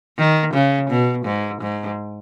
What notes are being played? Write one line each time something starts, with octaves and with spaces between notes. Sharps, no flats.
D#3
C#3
B2
G#2
G#2